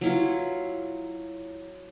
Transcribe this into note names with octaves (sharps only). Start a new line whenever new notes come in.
F#3 E4 F4